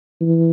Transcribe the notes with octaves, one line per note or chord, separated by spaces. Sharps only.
E3